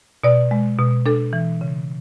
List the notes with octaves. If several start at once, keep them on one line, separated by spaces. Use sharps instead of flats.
B2 D5
G#3
B2
D4 A4
E3
C#3